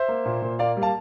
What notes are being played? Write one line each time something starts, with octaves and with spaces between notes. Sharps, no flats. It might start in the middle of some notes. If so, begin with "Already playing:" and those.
Already playing: C5 E5
A#3
A#2
A#2
A#3 D5 F5
G3
F5 A5